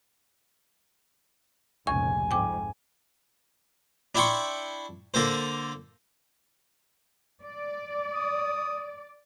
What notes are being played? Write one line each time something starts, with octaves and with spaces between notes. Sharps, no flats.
F1 C#2 A#2 G#5 C#6
F2 G#2 G5 D6
D4 E4 E5 G5 C6 C#6
D3 A#3 A4 C5
D5
D#6